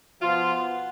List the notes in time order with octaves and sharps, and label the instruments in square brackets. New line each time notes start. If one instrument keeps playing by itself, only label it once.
[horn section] B2 F3 B3 F4